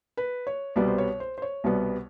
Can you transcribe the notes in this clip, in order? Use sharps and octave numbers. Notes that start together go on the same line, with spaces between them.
B4
C#5
C2 B2 G3 B3 D5
C5
C#5
C5
C5
C#5
C2 B2 G3 B3